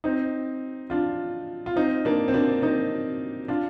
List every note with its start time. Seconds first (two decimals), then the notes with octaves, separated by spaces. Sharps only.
0.04 C4 D#4
0.90 D4 F4
1.66 F4
1.76 C4 D#4
2.05 A#3 D4
2.28 C4
2.34 A#3 D4
2.62 C4 D#4
3.48 D4 F4